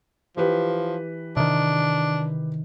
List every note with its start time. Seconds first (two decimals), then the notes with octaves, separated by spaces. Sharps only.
0.37 E3 F3 G4 B4
1.37 C3 D#3 D4